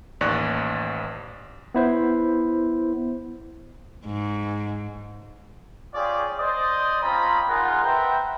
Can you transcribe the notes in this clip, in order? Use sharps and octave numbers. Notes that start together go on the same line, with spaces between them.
A1 D#2 D5 C#6 F#6
B3 E4 C5
G#2
F4 G4 G#4 C#5 D5
C5 D5 D#5
C4 C#4 F4 D#5 A#5 B5
G#3 D#4 F4 A#4 F#5
B4 C5 E5 F#5 G5 A#5